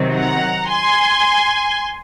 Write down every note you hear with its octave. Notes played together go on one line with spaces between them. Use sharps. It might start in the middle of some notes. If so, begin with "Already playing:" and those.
Already playing: C3 D#3 F#3 C4
F#5 A#5
G#5 C6